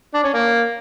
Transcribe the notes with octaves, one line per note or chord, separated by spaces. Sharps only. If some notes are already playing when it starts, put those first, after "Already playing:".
D4
C#4
A#3